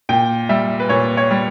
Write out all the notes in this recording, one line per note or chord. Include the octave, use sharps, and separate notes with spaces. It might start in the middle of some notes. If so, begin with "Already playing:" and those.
A#2 G5
G3 E5
B4
A#2 C#5
C#5
G3